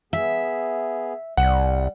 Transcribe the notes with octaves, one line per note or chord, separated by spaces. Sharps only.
B3 G#4 E5
C2 G3 F#5